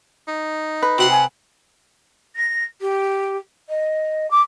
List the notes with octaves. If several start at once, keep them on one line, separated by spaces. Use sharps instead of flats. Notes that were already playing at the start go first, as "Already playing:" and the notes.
D#4
B4
C3 F#4 F#5 C6
G#5
A#6
G4
D#5
D6